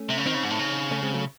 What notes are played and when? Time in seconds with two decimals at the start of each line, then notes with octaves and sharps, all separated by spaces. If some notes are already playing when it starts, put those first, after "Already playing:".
Already playing: A3 C#4
0.10 C3
0.18 C#3
0.26 D#3 C4 D#4
0.34 C#3
0.43 G#2
0.50 A2
0.59 C#3
0.91 A3 C#4
1.02 G#3 C4
1.14 F#3 A3